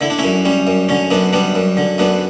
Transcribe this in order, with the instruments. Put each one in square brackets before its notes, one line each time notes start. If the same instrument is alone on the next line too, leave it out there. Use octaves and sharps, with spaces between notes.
[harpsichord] D3 E4
D4
F#2 C#4 E4
G3 C#4
F#2
D3 C#4
F#2 B3 D4
G3 B3 D4
F#2
D3
F#2 B3 D4